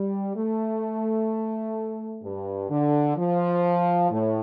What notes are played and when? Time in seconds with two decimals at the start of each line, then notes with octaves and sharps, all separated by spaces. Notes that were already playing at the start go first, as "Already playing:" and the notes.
Already playing: G3
0.35 A3
2.23 G2
2.70 D3
3.16 F3
4.10 A2